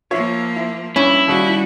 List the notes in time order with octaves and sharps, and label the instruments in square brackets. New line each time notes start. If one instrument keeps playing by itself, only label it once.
[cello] F3 A#3 [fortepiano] F4 C#5 E5
[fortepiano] E4
[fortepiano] G2 [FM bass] C#4 [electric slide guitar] E4
[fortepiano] D#2 C#3 [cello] G3 F#4